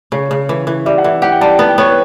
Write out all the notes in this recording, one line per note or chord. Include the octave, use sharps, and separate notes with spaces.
C#3 C#5
C#3
E3
E3
G3 E5
F#5
E3 E5
G4 F#5
G5
G3 A5
G5
B3 A5
G5
B3 C#5
B4